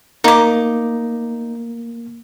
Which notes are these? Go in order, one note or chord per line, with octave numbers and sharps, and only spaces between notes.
A#3 D#4 D6